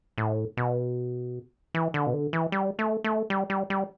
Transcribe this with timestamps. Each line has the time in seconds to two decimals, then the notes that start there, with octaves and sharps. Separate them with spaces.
0.18 A2
0.57 B2
1.75 E3
1.94 D3
2.07 B2
2.14 D3
2.33 E3
2.52 G3
2.79 A3
3.04 A3
3.30 G3
3.50 G3
3.70 G3